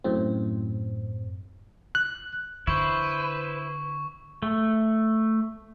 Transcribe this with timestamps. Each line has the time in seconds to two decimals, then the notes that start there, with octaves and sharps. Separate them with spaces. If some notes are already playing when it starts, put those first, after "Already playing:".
0.04 F#2 A2 C4
1.95 F#6
2.67 D3 E4 B4 C5 C#6
4.43 A3